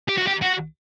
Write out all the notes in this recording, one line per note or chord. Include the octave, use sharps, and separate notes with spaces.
G4
F#4
G4
F#4